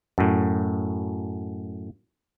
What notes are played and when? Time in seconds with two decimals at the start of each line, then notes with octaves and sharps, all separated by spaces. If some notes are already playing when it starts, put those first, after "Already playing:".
0.18 F#2 A2